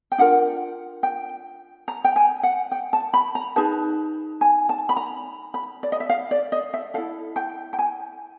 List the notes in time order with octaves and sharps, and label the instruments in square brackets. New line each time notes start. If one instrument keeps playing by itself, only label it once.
[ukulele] G5
D4 F4 A#4 F#5
G5
A#5
G5
G#5
F#5
G5
A5
B5
A#5
D#4 G#4 B4 A5
G#5
A5
B5
A#5
B5
D5
D#5
E5
F5
D5
D#5
E5
A4 F5
E4
G5
G5
G#5